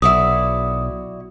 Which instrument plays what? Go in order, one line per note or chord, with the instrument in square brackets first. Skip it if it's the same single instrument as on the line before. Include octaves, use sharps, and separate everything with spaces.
[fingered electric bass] B1 [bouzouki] E4 F#4 D5 [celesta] D#6